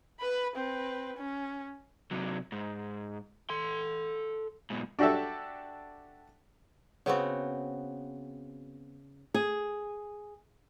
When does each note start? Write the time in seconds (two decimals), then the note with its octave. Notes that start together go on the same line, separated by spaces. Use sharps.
0.20 B4 B5
0.56 C4 B4
1.16 C#4
2.11 C3 F#3
2.52 G#2
3.50 A4 C6
4.70 G#2 B2
4.99 D4 F#4 G4 A4 E5
7.06 C#3 B3 C4 F#4
9.34 G#4